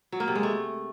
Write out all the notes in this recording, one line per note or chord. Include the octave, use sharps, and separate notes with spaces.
F#3
A#3
C3
G#3
A3